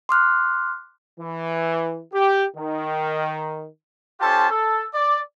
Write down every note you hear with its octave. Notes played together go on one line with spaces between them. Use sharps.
C6 D6 F6 F#6
E3
G4
D#3
C#4 F4 G4 A4 C5 A5
A4
D5